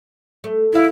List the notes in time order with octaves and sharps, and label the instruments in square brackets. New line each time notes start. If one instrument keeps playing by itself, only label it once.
[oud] A3
[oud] E2 F5 [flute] E4